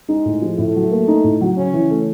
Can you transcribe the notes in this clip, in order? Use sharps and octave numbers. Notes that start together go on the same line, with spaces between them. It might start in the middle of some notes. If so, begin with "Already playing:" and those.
G#3 D#4
A2
F3
A2 A3
F#3
A#3
D#4
A2
F#3
C#3 C#4
E3
A3